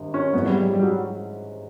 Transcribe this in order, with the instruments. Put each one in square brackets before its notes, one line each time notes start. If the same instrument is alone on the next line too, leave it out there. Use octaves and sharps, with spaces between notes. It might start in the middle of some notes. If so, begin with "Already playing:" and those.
Already playing: [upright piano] G#1 G2
[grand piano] C#4
[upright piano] G#2 E3 G#3 C#4 F4 [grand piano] B3
[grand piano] G3
G3
G3
F#3